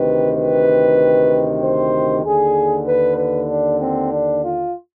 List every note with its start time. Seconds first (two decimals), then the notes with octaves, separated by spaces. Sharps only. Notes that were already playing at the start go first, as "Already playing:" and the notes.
Already playing: D2 C3 D#3 B4
0.37 B4
1.61 C5
2.24 D#2 D3 G#4
2.87 B4
3.17 B4
3.50 D4
3.80 C4
4.11 D4
4.43 F4